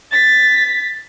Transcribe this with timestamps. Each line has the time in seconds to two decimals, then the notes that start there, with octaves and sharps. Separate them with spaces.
0.11 A6 B6